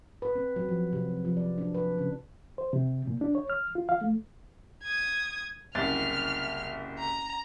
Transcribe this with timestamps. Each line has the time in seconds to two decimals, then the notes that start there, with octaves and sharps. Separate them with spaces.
0.22 B4
0.35 C4
0.56 F#3
0.69 F3
0.93 C3
1.25 F3
1.37 D5
1.58 D4
1.74 B4
1.98 C#3
2.58 C5
2.73 C3
3.07 A#2
3.21 D4
3.35 C#5
3.50 F6
3.75 F4
3.89 F5
4.01 A3
4.83 D#6 G#6
5.75 F#1 C2 F6 A6
6.99 A#5